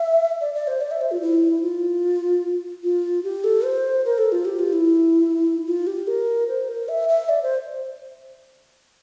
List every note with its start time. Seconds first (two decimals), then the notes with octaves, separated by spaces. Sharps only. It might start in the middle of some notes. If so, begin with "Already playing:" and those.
Already playing: E5
0.41 D5
0.54 D5
0.67 C5
0.81 D5
0.91 E5
1.01 C5
1.11 F4
1.22 E4
1.62 F4
2.84 F4
3.24 G4
3.44 A4
3.65 C5
4.05 A#4
4.18 A4
4.32 F4
4.45 G4
4.59 F4
4.73 E4
5.67 F4
5.87 G4
6.07 A#4
6.48 C5
6.68 A#4
6.88 E5
7.09 E5
7.29 D5
7.43 C5